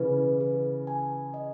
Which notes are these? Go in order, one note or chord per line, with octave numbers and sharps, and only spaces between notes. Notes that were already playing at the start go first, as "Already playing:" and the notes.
Already playing: C#3 E3 B4
G#4
G#5
D#5